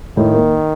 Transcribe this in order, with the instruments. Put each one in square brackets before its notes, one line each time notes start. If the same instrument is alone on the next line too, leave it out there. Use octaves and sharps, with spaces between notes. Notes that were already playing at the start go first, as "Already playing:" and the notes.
[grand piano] A2 [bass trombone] D#3
[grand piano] A#3